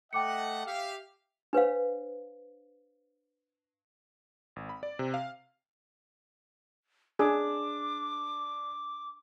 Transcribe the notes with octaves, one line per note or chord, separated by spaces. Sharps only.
A3 D#5 F#5 G5 D6 C#7
G4 E5 F5
D4 B4 C5 F5
G#1
B5
D5
C3
F5
D4 G#4 D6